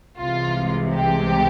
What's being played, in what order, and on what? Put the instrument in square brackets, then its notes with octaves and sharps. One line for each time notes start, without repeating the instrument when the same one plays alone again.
[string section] C2 C3 E3 G#3 F4
G4